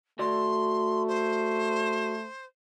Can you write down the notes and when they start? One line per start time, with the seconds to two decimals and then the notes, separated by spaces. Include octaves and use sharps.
0.19 A3 F#4 D5 C6
1.07 C5